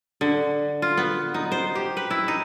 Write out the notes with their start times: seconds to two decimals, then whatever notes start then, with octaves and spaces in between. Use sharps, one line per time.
0.21 D3
0.82 F4
0.97 B3
1.34 D#4
1.52 C5
1.75 G4
1.97 B4
2.11 E4
2.28 D#4